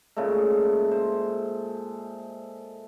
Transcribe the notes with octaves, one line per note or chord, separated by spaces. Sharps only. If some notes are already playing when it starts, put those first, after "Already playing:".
A#2 C#3 G#3 A3
C5